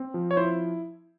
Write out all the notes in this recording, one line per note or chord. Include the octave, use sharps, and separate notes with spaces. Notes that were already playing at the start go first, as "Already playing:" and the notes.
Already playing: C4
F3
C#5
E4 C5